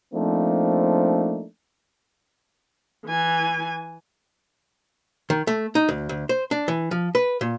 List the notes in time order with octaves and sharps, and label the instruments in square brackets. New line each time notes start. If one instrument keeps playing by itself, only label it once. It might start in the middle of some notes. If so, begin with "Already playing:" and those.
[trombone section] F3 A3 A#3 C4 D4 D#4
[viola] E3 G#5
[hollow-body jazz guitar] D#3
A3
D#4
D2
D2
C5
D4
E3
F3
B4
A#2